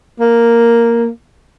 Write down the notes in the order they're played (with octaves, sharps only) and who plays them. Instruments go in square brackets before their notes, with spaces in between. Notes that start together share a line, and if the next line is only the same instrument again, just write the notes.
[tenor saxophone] A#3